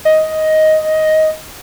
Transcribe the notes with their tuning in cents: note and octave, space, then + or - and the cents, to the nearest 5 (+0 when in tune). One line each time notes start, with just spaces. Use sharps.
D#5 +10